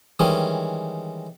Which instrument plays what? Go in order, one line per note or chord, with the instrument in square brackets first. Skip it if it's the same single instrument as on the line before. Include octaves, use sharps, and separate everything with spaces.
[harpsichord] D#3 E3 G3 G#3 C#4